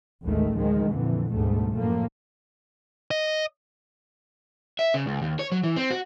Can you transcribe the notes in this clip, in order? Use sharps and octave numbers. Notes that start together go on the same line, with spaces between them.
A1 D#2 D#3 G#3 A3
D2 D#3 F3 G#3
F2 A#2 D3 E3
D2 G#2 B2 G3 A3
F#2 A2 F3 A3 A#3
D#5
E5
C#3
C#2
D#2
C#5
F#3
E3
C4
F#4